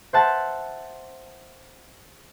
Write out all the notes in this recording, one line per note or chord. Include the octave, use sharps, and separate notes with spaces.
C5 E5 F#5 A5